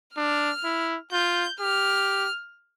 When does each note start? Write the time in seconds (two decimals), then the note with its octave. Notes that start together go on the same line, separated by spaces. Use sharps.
0.16 D4 F6
0.64 E4
1.12 F4 G6
1.60 G4 F6